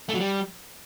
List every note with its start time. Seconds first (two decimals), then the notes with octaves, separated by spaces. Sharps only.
0.09 A3
0.14 F#3
0.20 G3